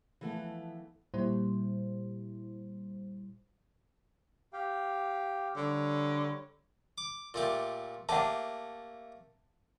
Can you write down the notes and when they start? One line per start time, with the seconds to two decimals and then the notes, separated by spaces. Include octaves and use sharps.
0.21 E3 F3 A3 B3
1.14 A#2 G3 E4 C5
4.53 G4 F5 G5
5.56 D3 G3 C#5
6.98 D6
7.34 A#2 A3 G4
8.09 A3 A#3 G4 F#5 A5